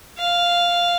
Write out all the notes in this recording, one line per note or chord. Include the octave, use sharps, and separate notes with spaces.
F5